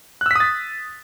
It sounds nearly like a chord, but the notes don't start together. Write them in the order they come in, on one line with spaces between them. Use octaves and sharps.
F#6 E6 B6 D#6 A6